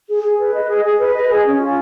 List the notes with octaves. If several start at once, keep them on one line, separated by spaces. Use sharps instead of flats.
G#4
G#4
B4
D#5
G#4
G#4
B4
D#5
G#4
C#4
F4